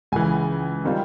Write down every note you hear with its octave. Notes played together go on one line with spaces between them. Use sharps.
C#2 C#3 E3 G#5
D#3 G3 C4 F4